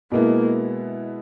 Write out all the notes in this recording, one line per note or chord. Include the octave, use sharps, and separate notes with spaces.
B2 G#3 A#3 B3 E4